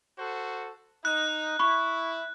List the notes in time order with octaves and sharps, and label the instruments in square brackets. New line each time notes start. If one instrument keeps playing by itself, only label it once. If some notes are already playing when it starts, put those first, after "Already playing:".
[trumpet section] F#4 A4 C5
[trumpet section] D#4 [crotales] F#6
[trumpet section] E4 [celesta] B5 C#6